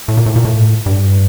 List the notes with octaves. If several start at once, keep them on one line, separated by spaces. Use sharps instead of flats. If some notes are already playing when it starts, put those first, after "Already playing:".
A2
A#2
A2
A#2
A2
G2